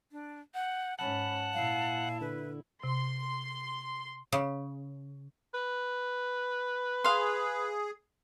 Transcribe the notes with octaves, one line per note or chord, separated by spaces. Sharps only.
D4
F#5 G6
G#2 C#4 F#5 A5 B5 F#6
A#2 E4 F5
D3 B4
C3 C6
C#3
B4
G#4 F5 C6